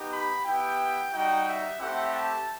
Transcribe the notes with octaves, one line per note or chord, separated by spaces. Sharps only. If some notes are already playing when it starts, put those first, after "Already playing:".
Already playing: B3 D#4 G4
B5
B3 E4 G4 G5
G3 D#4 F#4 G5
E5
A3 C4 E4 G4 F#5
A5